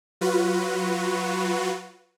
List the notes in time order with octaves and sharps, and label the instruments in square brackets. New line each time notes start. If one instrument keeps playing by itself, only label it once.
[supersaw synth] F#3 F4 F#4 B4